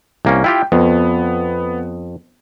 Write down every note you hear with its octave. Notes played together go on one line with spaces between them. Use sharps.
C2 A#3 C#4
E4 F4 G4 G5
F2 B3